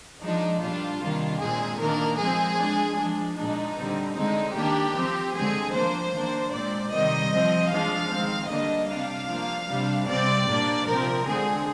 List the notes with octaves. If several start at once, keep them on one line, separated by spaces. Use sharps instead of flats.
F3 G#3 D4 D#4
A#2 G3 D4 F4
C3 D#3 G3 A#3 D4
A#2 G#3 C4 G#4
D#3 A#3 D4 A#4
F3 G#3 C4 G#4
F3 G#3 D4
F3 G#3 D4
A#2 G#3 D4 D#4
D3 G3 C4
D3 G#3 C4 D#4
D#3 A#3 D4 G4
F3 C4
D3 G#3 C4 G#4
F3 A#3 D4 C5
D#3 A#3 D4
A#2 G#3 C4 D5
C3 D#3 G3 C4 D#5
F3 C4
F3 G#3 D4 F5
D#3 G#3 C4
D3 G3 A#3 D4 D#5
C3 G3 D4 F5
F3 A#3 D4
C3 G3 D4
C3 G3 C4 D5
A#2 G3 A#3 D4
C3 F3 C4 A#4
D3 G#3 C4 G#4